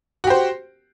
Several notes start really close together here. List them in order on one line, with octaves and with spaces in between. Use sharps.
F#4 G4 C5